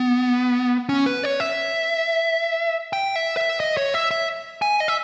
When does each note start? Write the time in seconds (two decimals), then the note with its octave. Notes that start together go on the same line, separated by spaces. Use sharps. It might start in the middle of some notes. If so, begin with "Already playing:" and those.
Already playing: B3
0.89 C#4
1.06 B4
1.24 C#5
1.40 E5
2.93 G5
3.16 E5
3.37 E5
3.60 D#5
3.77 C#5
3.94 E5
4.11 E5
4.62 G#5
4.80 D#5
4.88 E5